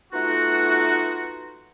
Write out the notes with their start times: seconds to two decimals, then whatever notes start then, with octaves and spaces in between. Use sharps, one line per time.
0.13 A3 B3 D#4 F4 F#4